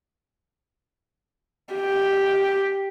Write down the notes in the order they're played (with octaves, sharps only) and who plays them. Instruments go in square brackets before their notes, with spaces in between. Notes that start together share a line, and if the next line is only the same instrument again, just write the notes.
[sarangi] G4